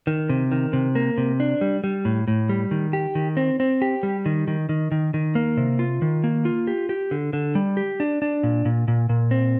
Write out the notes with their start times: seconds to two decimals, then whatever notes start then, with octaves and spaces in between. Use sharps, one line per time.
0.07 D#3
0.29 C3
0.52 D#3
0.73 C3
0.95 A#3
1.18 C3
1.40 D4
1.61 G3
1.84 G3
2.05 A2
2.28 A2
2.49 G3
2.71 D#3
2.93 G4
3.15 D#3
3.37 C4
3.60 C4
3.82 G4
4.03 G3
4.26 D#3
4.48 D#3
4.69 D#3
4.92 D#3
5.14 D#3
5.35 A#3
5.57 C3
5.79 F4
6.02 D#3
6.24 A#3
6.45 F4
6.67 G4
6.89 G4
7.11 D3
7.33 D3
7.55 G3
7.77 G4
8.00 D4
8.22 D4
8.43 A#2
8.65 A#2
8.88 A#2
9.09 A#2
9.31 C4